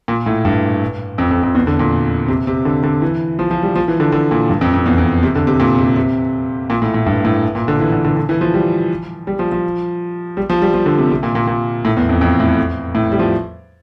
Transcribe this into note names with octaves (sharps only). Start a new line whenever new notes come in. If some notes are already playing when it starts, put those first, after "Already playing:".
A#2
A2
G2
F2
F2
F2
E2
D3
A#2
C3
C3
D3
D3
E3
F3
F3
G3
F3
E3
D3
D3
A#2
G2
F2
F2
E2
F2
C3
D3
C3
A#2
C3
C3
A#2
A2
A2
G2
A2
A#2
D3
E3
D3
D3
D3
E3
F3
G3
G3
F3
F3
G3
F3
G3
F3
D3
C3
C3
A#2
A#2
A#2
A2
E2
F2
F2
A2
A2
G3
F3